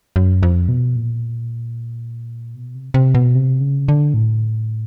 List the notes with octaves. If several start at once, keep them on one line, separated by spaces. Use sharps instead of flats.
F#2
F2
B2
A#2
B2
C3
C3
B2
C3
C#3
D3
A2